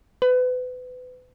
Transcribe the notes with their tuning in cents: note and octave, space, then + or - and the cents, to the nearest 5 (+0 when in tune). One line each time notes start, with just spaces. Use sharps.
B4 +30